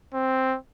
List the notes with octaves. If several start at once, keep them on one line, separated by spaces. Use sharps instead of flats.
C4